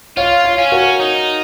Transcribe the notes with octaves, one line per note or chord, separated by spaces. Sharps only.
F4 C#5 F5
C#5 F5
C#4
F#4 A#4
D#4